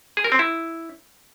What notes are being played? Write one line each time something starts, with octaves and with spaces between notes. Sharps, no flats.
G#4
A#4
C4
E4